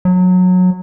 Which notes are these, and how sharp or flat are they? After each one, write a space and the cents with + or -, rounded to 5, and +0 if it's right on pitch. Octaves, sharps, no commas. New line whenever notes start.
F#3 -20